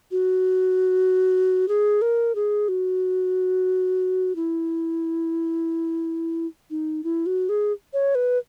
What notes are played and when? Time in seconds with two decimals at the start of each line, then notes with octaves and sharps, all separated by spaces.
0.11 F#4
1.68 G#4
2.02 A#4
2.35 G#4
2.68 F#4
4.36 E4
6.70 D#4
7.04 E4
7.26 F#4
7.49 G#4
7.93 C#5
8.15 B4